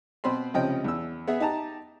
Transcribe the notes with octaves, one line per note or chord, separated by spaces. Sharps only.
B2 C4 B5 C6
C#2 C3 F3 C#4 D#5 G5
E2 E6
B3 G#4 E5
D#4 G4 A5 A#5